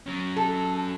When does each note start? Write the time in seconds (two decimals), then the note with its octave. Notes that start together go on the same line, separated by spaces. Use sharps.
0.06 F#3 C#4
0.36 A4